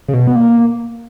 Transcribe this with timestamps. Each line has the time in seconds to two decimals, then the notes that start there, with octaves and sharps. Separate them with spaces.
0.08 C#3
0.13 B2
0.27 B3
0.36 A#3